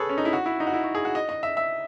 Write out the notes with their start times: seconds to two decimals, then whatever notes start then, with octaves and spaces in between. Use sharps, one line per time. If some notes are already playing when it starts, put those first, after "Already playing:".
Already playing: G#4 A4 B4 C#5
0.09 C#4
0.18 D#4
0.25 E4
0.33 F#4
0.46 E4
0.60 D#4
0.67 F#4
0.74 E4
0.84 F#4
0.95 G#4
1.05 F#4
1.15 D#5
1.29 D#5
1.43 E5
1.57 E5